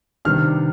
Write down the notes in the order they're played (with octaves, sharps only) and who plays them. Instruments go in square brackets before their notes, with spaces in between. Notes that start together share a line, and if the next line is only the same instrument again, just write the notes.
[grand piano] C3 D#3 G3 B3 D4 F6